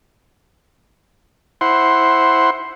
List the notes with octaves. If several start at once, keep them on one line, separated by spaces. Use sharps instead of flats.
E4 C5 F#5 C6